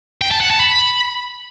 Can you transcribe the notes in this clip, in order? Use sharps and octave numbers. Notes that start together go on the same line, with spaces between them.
G5
A5
F#5
A5
B5